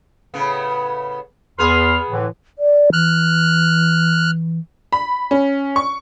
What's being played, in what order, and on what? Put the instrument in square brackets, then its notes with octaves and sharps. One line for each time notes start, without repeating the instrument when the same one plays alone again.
[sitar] A2 C#3 B3
[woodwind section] E2 C6 F6 [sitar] B3 G#4 B4
[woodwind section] A2 D3 E3
[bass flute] D5
[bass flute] E3 [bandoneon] F6 F#6
[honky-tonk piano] B5
C#4
C#6